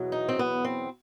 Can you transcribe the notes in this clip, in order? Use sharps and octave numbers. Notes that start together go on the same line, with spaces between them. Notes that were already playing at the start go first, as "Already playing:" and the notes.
Already playing: E2 B2 F#3
D#4
C4
B3
C4